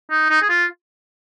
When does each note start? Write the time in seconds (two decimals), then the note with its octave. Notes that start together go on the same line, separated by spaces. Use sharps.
0.10 D#4
0.29 D#4
0.41 G#4
0.49 F4